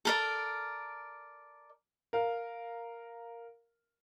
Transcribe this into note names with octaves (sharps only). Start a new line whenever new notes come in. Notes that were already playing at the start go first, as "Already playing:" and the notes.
A4 A#4 D5
A#4 F5